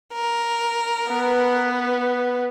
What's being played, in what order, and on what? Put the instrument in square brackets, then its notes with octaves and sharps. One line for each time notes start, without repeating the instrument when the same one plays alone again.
[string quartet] A#4
[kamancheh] B3 B4